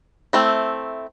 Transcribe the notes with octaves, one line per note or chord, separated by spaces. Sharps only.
A3 C4 E4